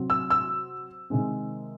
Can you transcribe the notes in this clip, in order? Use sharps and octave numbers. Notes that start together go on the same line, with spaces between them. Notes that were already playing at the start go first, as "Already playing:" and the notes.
Already playing: C3 F#3 C4
E6
E6
C3 D#3 G#3 C4